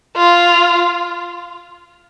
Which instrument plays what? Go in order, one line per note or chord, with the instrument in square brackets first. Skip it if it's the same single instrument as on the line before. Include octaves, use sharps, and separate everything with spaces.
[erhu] F4